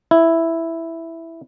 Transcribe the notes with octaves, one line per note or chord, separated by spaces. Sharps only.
E4